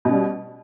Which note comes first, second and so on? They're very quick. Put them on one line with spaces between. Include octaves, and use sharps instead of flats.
B2 C#4 G3